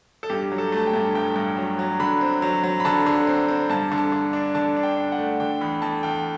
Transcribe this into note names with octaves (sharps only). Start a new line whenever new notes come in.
A4
G2 G4
F#3
A4
A3
A5
G5
G2
G1 G5
G2
F#3
F#3
D3 B5
C4
F#3
F#3
B5
D3 A5
D3
C4
C4
G2 A5
D3
A5
D3
D4
D3 A5
D4
G5
D4
F#5
A3
D3 G5
E2 B5
E2 A5
E2 G5